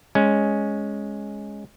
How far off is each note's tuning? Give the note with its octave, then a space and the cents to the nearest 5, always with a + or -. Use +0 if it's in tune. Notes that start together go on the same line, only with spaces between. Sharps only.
G#3 +0 C#4 +0